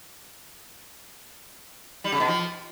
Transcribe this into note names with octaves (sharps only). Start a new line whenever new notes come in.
G3
C#3
B2
F3